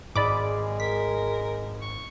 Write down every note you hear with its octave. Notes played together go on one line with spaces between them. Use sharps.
G#1 G#3 G#4 D5 B5 D6 D#6
A#4 B6
C#6